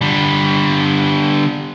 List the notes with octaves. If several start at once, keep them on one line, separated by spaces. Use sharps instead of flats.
D3 G3